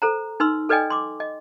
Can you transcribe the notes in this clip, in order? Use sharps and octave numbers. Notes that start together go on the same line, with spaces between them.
A4 C5 A#5
D#4 B4 C6 E6
A4 B4 D5 D#5 G5 G#5
C6 D6
D#5